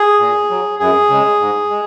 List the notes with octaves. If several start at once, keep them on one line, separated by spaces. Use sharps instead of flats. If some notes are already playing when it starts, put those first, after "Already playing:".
Already playing: G#4
A#2
F#3
F#2 G#4
C#3 G#3
G#2
G#3